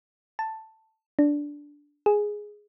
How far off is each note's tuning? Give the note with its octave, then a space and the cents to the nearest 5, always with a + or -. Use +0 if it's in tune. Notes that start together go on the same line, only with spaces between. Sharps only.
A5 +5
D4 -10
G#4 +0